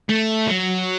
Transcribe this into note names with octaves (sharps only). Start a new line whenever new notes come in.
A3
F#3